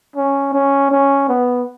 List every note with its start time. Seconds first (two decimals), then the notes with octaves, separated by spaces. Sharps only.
0.16 C#4
0.53 C#4
0.91 C#4
1.29 B3